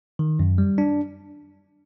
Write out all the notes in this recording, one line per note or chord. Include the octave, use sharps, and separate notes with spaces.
D#3
F#2
G3
D4